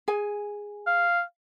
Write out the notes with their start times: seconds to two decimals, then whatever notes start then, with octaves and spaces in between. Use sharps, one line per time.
0.08 G#4 G#5
0.87 F5